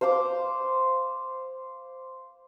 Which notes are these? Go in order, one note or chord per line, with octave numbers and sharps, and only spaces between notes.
C5 F5 C6 D6